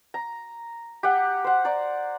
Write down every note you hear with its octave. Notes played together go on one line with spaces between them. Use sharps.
A#5
G4 F#5
C5 F#5
D5 A#5